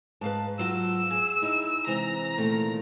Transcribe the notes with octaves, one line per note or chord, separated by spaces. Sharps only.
G#2 B4 F5 A5
F#3 F4 F#4 E6
G#4
D#4 E4
C3 E3 G#3 A#5
A#2 D#3 A3